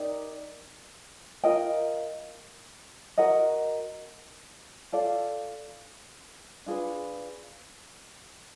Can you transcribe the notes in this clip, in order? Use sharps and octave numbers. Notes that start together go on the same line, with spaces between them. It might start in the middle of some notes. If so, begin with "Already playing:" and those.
Already playing: D#4 G4 A#4 D5
F4 A#4 D#5 G5
F#4 A#4 D#5 F#5
F4 A4 D5 F5
D4 F4 G#4 B4